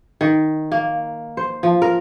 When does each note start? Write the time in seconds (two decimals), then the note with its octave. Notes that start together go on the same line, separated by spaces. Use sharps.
0.21 D#3
0.72 A#3
1.37 C5
1.63 F3
1.82 A#4